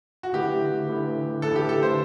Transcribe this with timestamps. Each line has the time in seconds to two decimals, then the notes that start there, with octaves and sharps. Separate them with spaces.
0.23 F#4
0.33 D3 A3 E4 G4 B4
0.88 D3 A3 E4 B4
1.42 D3 A3 E4 A4 B4
1.56 G4
1.69 A4
1.83 C5